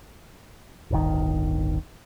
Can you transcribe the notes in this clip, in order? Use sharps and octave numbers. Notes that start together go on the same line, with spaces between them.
D1 G1 D#3